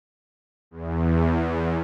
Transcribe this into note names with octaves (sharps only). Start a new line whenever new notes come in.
E2